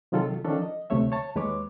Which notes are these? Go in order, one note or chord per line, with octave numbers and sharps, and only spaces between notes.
C3 D#3 F#3 F4 G#4 A4
D#3 F3 C#4 D4 A4 A#4
D#5
D2 C3 A3 C#5 E5
C#5 A5
D#2 G#3 B4 C#5 D6